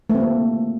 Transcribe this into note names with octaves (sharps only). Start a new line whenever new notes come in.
A3
C4
A#3